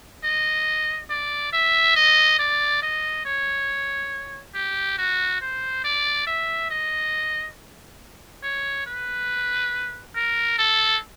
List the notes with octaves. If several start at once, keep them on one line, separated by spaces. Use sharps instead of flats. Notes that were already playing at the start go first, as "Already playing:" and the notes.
D#5
D5
E5
D#5
D5
D#5
C#5
G4
F#4
C5
D5
E5
D#5
C#5
B4
A#4
A4